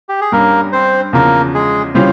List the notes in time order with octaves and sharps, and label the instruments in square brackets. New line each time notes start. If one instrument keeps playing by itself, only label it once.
[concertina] G4
G#4
[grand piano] G2 G3 C#4 [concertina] A#3 A#4
[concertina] C4 C5
[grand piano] E2 C#3 F3 [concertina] A#3 A#4
[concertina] G#3 G#4
[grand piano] C#3 E3 G3 C#4 F4 [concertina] C4 C5